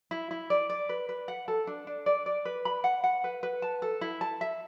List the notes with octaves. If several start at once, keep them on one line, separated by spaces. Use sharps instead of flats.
E4
E4
D5
D5
B4
B4
F#5
A4
D4
D4
D5
D5
B4
B5
F#5
F#5
B4
B4
A5
A4
E4
A5
E5